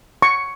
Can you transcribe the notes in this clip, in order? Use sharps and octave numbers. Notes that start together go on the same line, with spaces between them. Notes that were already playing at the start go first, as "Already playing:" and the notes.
C#6